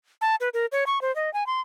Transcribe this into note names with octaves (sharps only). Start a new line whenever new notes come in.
A5
B4
A#4
C#5
C#6
C5
D#5
G#5
C6